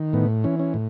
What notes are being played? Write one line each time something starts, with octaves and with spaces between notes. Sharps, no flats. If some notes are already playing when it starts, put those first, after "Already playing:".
Already playing: D#3
A2 B3
E3 C#4
C#4
A2